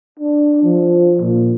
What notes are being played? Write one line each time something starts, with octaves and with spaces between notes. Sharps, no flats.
D4
F3
A#2